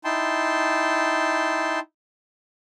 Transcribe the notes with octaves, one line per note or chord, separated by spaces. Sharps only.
D#4 E4 G5 A5 C6